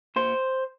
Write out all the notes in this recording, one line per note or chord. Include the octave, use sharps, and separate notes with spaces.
A#2 C5